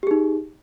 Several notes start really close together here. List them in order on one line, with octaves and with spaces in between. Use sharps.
G4 G#4 D#4